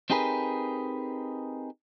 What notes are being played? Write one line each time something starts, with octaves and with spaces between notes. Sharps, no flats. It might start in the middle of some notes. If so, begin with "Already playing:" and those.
C4 D#4 G4 G#4 A#4 B4